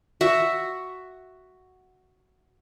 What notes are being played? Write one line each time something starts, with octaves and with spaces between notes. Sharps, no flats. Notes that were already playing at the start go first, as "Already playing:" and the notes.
F#4 E5